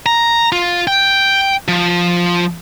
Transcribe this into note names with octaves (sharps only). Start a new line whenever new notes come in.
A#5
F4
G5
F3